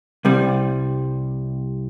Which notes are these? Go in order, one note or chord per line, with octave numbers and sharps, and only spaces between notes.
C2 C3 G3